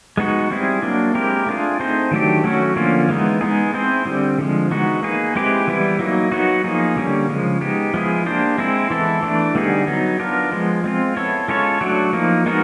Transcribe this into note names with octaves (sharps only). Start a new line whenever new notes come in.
G#3 B3 D#4 F#4
G3 C4 E4 G#4
F#3 A#3 D4
G#3 C4 E4 G4 A#4
A3 D4 F4 G#4
A3 C4 D#4 G#4 C5
D#3 F#3 A3 D4 G4
F#3 A3 C#4 F#4
D3 F3 A#3 C#4 F4
E3 G#3 B3 D#4
G#3 B3 D#4 G#4
C4 E4 G#4 C5
D3 G3 C4
D3 F3 G#3
E3 G#3 B3 D#4 F#4
A#3 D#4 G#4 B4
G#3 C4 E4 G4 B4
E3 G3 B3 E4
F#3 A#3 D#4
F#3 B3 D#4 F#4
F3 A#3 D#4 G#4
D3 G3 A#3 C#4
C#3 F3 G#3
G#3 B3 D#4 G4
F3 G#3 B3 E4 G#4
A#3 D4 G4 C5
G#3 C4 E4
E3 G#3 B3 E4 A4
E3 A3 D4
D3 G3 B3 D#4 G#4
F#3 B3 D#4
B3 D4 F4 A#4
F3 G#3 B3
G#3 C4 F4
B3 E4 A4 C#5
G#3 C#4 F4 A4 C#5
F#3 A3 D4 F#4
F3 A#3 D#4
G#3 B3 D#4 F#4 A#4